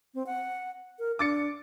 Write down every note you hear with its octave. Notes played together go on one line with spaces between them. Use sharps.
C4
F#5
A#4
D4 D6 A6 C#7